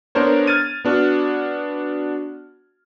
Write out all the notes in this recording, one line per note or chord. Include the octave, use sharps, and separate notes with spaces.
B3 D4 A#4 C5 C#5
F6 G#6 A6 D#7
B3 D4 F#4